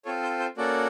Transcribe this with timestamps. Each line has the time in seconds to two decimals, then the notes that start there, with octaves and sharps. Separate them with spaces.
0.05 C4 F4 A4 C#5
0.23 C5
0.40 C5
0.57 A#3 C#4 F#4 A4 D5